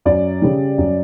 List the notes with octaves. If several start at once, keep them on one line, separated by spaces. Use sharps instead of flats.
F#2 D5
C#3 G3
F#2